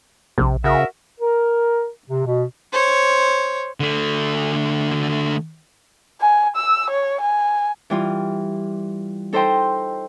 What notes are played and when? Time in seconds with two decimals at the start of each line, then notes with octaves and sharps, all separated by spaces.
0.38 A#1 C3
0.64 C#3 F#4 A#4 E5
1.19 A#4
2.08 C3
2.25 B2
2.72 C5 C#5
3.80 D3 A3
6.20 G#5
6.56 E6
6.90 C#5
7.20 G#5
7.90 E3 G3 F4
9.33 D#4 A4 C5 D#5 G5 C6